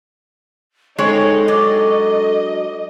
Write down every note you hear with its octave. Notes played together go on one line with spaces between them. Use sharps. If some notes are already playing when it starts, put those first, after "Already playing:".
G#3 C4 D#4 A4 C#5
F#3 D4 D5 D#5